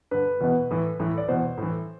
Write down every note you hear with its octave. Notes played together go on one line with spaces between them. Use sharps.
G2 D3 B4
E2 B2
A2 E3
A2 E3
D5
E2 B2 C5
A2
E3